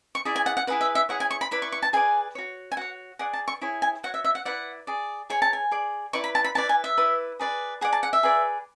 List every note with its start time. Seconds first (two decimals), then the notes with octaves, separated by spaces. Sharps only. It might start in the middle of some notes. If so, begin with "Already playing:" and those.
0.15 C#6
0.25 E4 G#4 D5
0.36 G#5
0.46 F#5
0.57 F#5
0.67 E4 G#4 B4 F#5
0.81 E5
0.95 E5
1.09 E4 G#4 C#5 F#5
1.20 G#5
1.31 C#6
1.41 B5
1.51 E4 B4 D5 B5
1.62 C#6
1.72 C#6
1.82 A5
1.93 G#4 B4 D5 G#5
2.35 F#4 C#5
2.72 G#5
2.77 F#4 C#5 F#5
3.19 G#4 D5 F#5
3.33 A5
3.48 C#6
3.62 E4 G#4 C#5
3.82 G#5
4.03 F#4 C#5 F#5
4.14 E5
4.24 E5
4.35 F#5
4.45 E4 B4 D5 F#5
4.87 G#4 D5
5.30 G#4 C#5 G#5
5.42 A5
5.53 G#5
5.72 G#4 D5
6.13 E4 B4 D5 C#6
6.24 B5
6.35 A5
6.44 B5
6.55 E4 B4 D5 A5
6.69 G#5
6.84 E5
6.97 E4 B4 D5
7.39 G#4 B4 D5
7.81 G#4 D5 F#5
7.93 A5
8.03 F#5
8.13 E5
8.23 G#4 B4 D5